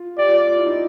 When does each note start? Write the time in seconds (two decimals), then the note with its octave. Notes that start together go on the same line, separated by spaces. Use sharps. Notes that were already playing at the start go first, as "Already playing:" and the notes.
Already playing: F4
0.18 G4 D5
0.28 F4
0.47 F4
0.57 E4
0.66 D#4